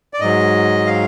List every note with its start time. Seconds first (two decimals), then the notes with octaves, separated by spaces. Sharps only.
0.14 D5
0.20 G#2 F#3 D#5
0.87 F5